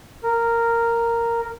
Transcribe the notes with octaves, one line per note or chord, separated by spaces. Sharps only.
A#4